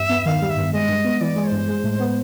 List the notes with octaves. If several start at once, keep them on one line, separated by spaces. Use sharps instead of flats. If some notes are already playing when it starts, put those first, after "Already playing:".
Already playing: E2 G2 E5
B3
D#3 F5
G3
E5
G2
G#3 D#5
G2
B3
E3 D5
G#3
C#5
G2 C5
G#3
A2
B3